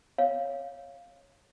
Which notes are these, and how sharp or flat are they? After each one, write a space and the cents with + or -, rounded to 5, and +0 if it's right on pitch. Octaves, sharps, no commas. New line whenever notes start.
C#5 +0 F5 +0